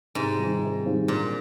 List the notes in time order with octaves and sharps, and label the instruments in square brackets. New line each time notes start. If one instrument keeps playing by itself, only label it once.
[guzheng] G#2 [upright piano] C3
[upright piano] D#3 G3 C4 F4
C3
D#3 G3 C4 F4
[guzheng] A#2 [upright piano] D3